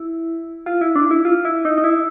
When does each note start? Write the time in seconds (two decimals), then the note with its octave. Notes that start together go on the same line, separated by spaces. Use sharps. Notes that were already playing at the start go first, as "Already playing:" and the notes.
Already playing: E4
0.66 F4
0.81 E4
0.96 D4
1.11 E4
1.25 F4
1.45 E4
1.65 D#4
1.78 D#4
1.84 E4